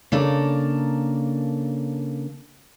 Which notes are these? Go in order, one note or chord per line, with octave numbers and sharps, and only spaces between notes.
C#3 A#3 D4 A4 A#4